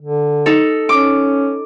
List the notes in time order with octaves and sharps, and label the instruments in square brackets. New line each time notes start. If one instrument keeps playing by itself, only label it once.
[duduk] D3
[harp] D#4 A4
[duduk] C#4 [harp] D6